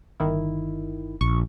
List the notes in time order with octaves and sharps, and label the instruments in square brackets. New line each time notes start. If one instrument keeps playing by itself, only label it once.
[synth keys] G1 D#3 E4
[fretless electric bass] A#1 [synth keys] C#6